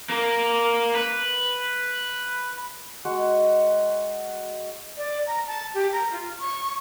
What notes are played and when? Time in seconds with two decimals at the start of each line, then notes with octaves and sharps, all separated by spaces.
0.10 A#3
0.95 B4
3.05 G#3 F#4
4.96 D5
5.27 A#5
5.47 A5
5.74 G4
5.93 A#5
6.12 F4
6.39 C#6